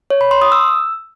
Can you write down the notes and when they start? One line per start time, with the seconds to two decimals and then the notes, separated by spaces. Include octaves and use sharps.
0.10 C#5
0.21 B5
0.31 C6
0.42 D#6
0.52 E6